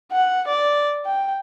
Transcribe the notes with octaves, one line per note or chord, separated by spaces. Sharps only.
F#5
D5
G5